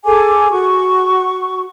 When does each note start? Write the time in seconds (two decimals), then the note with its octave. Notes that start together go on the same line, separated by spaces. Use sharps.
0.05 G#4 A4 G#5 D6
0.51 F#4 C#6